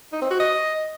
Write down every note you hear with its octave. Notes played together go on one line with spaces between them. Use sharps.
D#4
C4
F#4
D#5